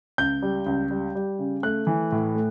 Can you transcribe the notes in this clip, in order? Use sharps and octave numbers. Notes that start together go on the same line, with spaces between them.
C#2 G6
G3
C#2
G3
G3
C#3
A3 F#6
E3
A2
A3